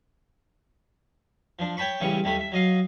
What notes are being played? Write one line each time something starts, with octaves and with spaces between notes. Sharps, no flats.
F3 D4
C#5 G5 A5 B5 C#6
A1 C#3 E3 G3 C#6
D#2 G3 A3 B5
E5
F#3 D#5 F5